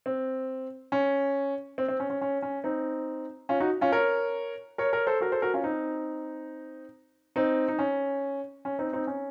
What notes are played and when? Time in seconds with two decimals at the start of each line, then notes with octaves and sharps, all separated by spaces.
0.06 C4
0.92 C#4
1.78 C4
1.88 C4
2.00 C#4
2.10 C#4
2.21 C#4
2.42 C#4
2.64 C4 D#4
3.49 C#4 F4
3.60 D#4 F#4
3.81 C#4 F4
3.92 A#4 C#5
4.78 A#4 C#5
4.93 A#4 C#5
5.07 A4 C5
5.21 F#4 A#4
5.32 A4 C5
5.42 F#4 A#4
5.54 C#4 F4
5.64 C4 D#4
7.36 C4 D#4
7.68 D#4
7.79 C#4
8.65 C#4
8.79 C4 D#4
8.93 C4 D#4
9.07 C#4